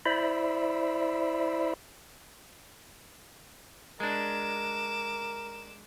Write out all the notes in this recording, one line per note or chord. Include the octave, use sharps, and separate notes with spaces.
E4 C5 D5 E5 B5
G#3 D4 A#4 D6 E7